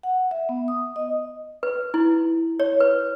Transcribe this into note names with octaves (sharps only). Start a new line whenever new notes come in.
F#5
E5
B3
D#6
D#5
B4
E4
C#5
B4